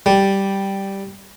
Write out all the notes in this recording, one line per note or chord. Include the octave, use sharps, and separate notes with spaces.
G3